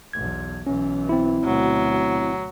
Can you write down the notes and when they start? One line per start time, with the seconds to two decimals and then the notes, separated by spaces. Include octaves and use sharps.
0.13 B1 E2 G#6
0.67 B1 E3 C#4
1.09 C4 E4
1.44 D2 B2 F#3